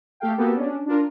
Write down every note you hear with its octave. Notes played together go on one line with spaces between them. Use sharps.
A3 G4 A4 F5 G5
A#3 B3 F#4 G4 A4
C#4 D4
D4 F4 A#4